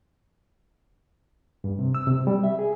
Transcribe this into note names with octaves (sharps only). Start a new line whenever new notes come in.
G2
C3
E6
C3
G3
E5
G#4